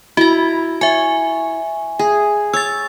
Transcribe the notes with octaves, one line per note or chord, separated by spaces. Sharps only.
E4 F#4 A#5
C#5 E5 G#5
G#4
C#5 E6 A6